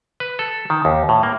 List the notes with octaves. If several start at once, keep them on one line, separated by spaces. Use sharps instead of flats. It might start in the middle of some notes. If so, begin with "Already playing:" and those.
B4
A4
D#3
D#2
A2
A#3